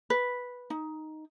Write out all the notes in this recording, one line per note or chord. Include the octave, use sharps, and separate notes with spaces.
B4
D#4